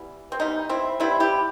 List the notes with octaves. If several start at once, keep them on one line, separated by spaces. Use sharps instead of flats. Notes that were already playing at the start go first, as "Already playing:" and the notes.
Already playing: E3 G3 B3
C4
E3 G3 B3 D#4
C4 E4
E3 G3 B3 C4 E4
E4 G4